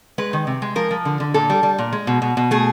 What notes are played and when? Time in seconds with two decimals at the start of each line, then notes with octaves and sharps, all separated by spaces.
0.18 G#3 B4
0.33 D#3
0.47 C3
0.62 G#3
0.75 F3 A#4
0.91 F3
1.05 D3
1.20 D3
1.34 A#2 A4
1.50 G3
1.63 G3
1.79 A#2
1.92 G#3
2.07 B2
2.22 B2
2.37 B2
2.51 A3 G#4